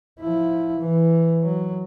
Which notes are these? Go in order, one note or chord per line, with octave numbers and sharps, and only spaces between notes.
F3 E4
E3
F#3